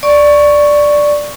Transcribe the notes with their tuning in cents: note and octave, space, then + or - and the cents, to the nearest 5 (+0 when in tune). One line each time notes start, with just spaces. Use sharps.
D5 +0 C#6 +0